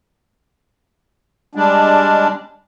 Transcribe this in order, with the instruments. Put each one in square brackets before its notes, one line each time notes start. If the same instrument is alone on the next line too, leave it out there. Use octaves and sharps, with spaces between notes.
[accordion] G3 G#3 D4